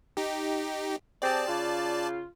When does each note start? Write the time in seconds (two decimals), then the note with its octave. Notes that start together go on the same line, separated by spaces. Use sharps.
0.17 D#4 G4
1.22 C4 G4 G#4 D5 A5
1.48 C#3 F4